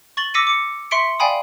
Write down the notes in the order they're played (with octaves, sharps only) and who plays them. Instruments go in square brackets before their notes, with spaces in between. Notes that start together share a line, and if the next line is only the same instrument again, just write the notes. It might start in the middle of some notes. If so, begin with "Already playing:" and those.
[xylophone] C#6 A6 F#7 G7
D6 E6 A#6 B6 C#7 D#7
D6 C#7
E5 C6 C#6 B6 C#7 D7
D5 F5 G5 G#5 B5 D#6